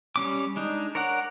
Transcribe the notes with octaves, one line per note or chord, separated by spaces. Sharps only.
G3 C#4 D6
G#3 D4 D#4
A#4 C#5 D5 F#5